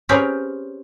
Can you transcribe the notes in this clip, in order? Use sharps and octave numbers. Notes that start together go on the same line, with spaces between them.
C4 C#4 G4 G#4 A#4 B4